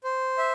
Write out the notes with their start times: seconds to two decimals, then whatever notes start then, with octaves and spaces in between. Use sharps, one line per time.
0.04 C5
0.38 E5